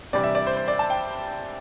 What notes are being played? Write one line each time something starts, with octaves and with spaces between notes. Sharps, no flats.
C3 E3 G3 D4 D5
E5
D5
C5
C5
D5
A5
G5